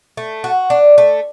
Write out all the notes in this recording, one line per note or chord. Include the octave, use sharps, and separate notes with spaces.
A3
F#4
D4
A3